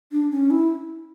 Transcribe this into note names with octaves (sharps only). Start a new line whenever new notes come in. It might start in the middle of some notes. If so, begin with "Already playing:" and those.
D4
C#4
E4